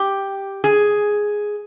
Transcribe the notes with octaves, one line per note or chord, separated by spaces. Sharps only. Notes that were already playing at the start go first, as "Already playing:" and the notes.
Already playing: G4
G#4